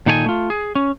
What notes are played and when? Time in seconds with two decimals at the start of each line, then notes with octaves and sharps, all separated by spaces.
0.06 A#2 D#3 D#4 A4 A#4 G#5
0.26 A3 F4
0.50 G#4
0.75 C#4